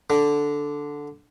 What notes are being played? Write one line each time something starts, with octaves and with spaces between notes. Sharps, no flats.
D3